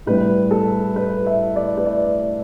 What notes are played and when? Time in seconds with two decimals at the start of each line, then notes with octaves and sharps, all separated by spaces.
0.06 A2 G3 B4
0.51 A4
0.96 B4
1.26 E5
1.56 D5
1.77 B4
1.86 D5